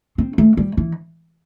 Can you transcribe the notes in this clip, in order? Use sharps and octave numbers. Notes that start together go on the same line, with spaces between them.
C4
A3
G3
E3